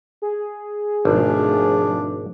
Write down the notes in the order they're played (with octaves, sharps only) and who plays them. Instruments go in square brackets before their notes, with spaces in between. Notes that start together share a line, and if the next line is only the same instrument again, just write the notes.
[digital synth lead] G#4
[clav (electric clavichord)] G#1 [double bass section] B2 F3 A3 [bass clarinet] D4